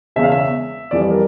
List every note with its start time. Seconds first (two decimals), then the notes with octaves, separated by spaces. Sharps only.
0.16 E1 E2 C#3 E5
0.23 F5
0.32 E5
0.91 F2 E3 G3 D5
1.02 D5
1.11 A#4